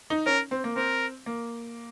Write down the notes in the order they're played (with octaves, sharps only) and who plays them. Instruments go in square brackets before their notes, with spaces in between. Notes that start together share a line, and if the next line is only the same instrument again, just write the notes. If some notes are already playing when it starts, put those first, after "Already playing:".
[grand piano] D#4
[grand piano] C#4 [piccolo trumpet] A#4
[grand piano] C4
A#3
[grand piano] C4 [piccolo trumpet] A#4
[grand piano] A#3